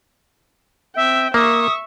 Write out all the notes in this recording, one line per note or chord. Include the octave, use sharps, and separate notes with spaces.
C4 E5 G5
A#3 E5 C#6 D#6